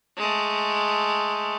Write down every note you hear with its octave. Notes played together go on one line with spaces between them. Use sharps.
G#3 A3